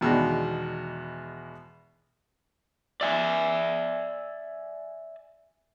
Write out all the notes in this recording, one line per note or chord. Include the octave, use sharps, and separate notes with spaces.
E2 B2 D#3 G#3 D4
D5 E5 G5 G#5